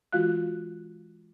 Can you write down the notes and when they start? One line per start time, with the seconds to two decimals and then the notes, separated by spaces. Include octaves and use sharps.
0.13 E3 G#3 F4 F#4 F5 F#6